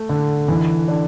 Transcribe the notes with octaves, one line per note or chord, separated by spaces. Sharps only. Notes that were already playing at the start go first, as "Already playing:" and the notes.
Already playing: A3
D3
E3
D4